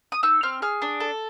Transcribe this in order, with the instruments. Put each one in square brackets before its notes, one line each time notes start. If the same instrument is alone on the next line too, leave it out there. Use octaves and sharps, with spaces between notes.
[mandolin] D#6
D#4 E6
C4 F6
G#4 F6
D4
A4